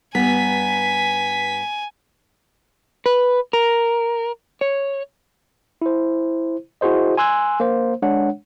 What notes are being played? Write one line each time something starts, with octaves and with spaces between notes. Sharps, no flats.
G2 B3 G#5 A#5 B6
B4
A#4
C#5
E4 C5
E4 F#4 G#4 C5 D#5
G#5 C6 E6 F#6 G#6
A#3 C5
G#3 D4 C#5 F#5